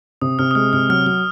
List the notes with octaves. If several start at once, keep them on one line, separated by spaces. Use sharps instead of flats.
C3 D#6
C3 F6
D#6
G#3 F6
C3 F6
F#3 F6
F#3 F6